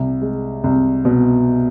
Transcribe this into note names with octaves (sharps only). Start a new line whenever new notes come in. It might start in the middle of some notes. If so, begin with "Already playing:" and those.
Already playing: C2
G#3
C2
B2